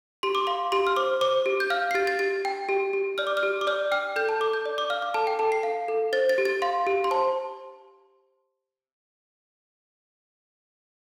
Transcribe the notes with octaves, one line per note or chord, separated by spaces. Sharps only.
G4 C6
D6
F5 C6
G4 C6
F6
C5 D6
C5 D6
G4
G6
F5 F6
C7
G4 A6
A6
G4 A6
G5
G4
G4
D5 F6
D6
F6
G4
D6
D5 F6
G5 F6
A4 G6
A5
A4 D6
G6
D5
D6
F5 F6
D6
A4 A5
G5
A4 A5
C7
F5
A4
C5 A6
A6
G4
A6
F5 C6
G4
C6
C5 A5